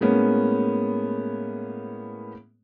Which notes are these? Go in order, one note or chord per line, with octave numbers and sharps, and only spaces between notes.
A2 G#3 A#3 B3 C#4